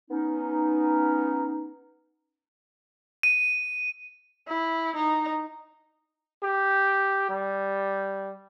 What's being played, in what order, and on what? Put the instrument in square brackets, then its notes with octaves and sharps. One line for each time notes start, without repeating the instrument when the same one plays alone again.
[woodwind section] B3 C#4 D#4
[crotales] D#7
[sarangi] E4
D#4
[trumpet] G4
G3